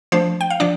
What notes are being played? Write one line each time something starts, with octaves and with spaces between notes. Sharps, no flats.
F3 A3 D4 C5
G5
F5
F3 D4 D5